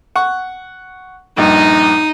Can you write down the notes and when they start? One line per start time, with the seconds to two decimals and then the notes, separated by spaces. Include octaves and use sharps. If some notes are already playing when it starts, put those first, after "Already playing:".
0.16 F#5 C#6
1.37 A#1 G2 D#4 D#5